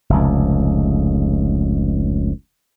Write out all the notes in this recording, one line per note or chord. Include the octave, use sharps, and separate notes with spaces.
F1 C#2